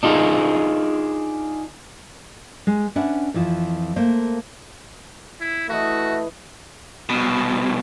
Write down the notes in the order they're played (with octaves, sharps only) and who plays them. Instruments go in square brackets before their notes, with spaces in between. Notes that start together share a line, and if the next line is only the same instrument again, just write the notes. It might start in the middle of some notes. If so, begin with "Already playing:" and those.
[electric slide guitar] D4 D#4 F4 G#4
[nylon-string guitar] G#3
C#4 D4 B4 E5 F#5
F2 E3 F3
A3 A#3 C5 F5
[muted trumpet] E4
[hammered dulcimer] E3 D#5 [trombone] A3 [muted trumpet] F#4
[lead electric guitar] C2 B2